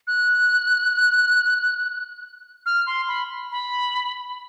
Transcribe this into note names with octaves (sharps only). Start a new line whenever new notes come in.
F#6
F6
C6
B5
B5